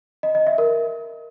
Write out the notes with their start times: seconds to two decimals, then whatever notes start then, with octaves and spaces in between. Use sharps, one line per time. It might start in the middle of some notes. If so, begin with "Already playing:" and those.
0.23 D#5
0.35 D#5
0.47 E5
0.58 A#4